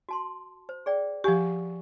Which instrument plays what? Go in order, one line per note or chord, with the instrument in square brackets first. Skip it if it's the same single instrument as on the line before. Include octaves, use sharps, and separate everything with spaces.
[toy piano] F#4 A5 C6
C5
G#4 D5 G5
[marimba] F3 G4 [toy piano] F#5 G#5 C#6